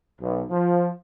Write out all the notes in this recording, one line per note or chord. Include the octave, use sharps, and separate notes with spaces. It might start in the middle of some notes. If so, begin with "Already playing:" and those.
B1
F3